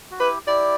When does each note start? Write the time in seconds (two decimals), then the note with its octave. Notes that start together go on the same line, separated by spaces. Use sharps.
0.11 F#4
0.19 E4 G4 B4
0.47 E4 G4 D5